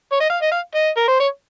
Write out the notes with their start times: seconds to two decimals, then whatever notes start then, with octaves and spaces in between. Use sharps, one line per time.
0.12 C#5
0.20 D#5
0.30 F5
0.42 D#5
0.51 F5
0.75 D#5
0.96 A#4
1.08 C5
1.19 C#5